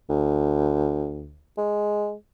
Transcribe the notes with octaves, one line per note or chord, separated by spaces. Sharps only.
D2
G#3